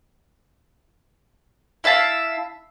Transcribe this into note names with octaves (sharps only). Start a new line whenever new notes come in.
E4 E5 F5 A5